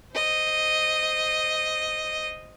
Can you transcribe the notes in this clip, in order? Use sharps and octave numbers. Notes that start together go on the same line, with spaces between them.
C5 D#5